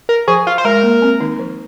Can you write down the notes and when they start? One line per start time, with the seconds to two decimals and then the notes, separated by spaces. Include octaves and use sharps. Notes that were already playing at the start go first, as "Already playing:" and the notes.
0.09 A#4
0.28 F3 G#4
0.47 F4
0.58 C5
0.65 G#3 A#4
0.83 A#3
1.02 C4
1.20 D#3 D#4
1.39 F3